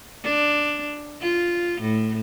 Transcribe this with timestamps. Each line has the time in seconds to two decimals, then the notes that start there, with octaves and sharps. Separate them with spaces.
0.23 D4
1.22 F4
1.81 A2